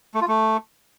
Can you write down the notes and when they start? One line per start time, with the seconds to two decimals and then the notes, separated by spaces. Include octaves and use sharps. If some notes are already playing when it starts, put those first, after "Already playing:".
0.14 A3
0.21 F4
0.28 A3